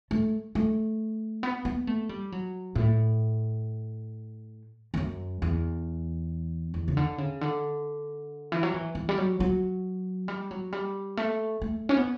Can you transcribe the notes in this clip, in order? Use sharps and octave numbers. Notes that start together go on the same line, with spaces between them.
A3
A3
B3
B3
A3
G3
F#3
A2
E2
F#2
E2
E2
C#3
D3
C#3
D3
E3
F#3
E3
E3
G3
F#3
F#3
G3
F#3
G3
A3
A3
C#4
B3